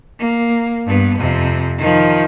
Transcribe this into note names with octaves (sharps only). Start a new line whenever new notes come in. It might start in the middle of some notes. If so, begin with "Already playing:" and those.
A#3
G2 B3
F2 C3
D#3 F3